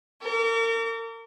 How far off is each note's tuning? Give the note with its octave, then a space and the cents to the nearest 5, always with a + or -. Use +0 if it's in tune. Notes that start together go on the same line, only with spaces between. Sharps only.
A#4 -35 D6 -40